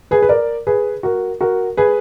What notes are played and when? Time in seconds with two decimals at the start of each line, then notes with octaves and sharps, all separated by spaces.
0.11 G#4 B4
0.22 B4
0.29 A#4 D5
0.67 G#4 B4
1.03 F#4 A#4
1.41 F#4 A#4
1.77 G#4 B4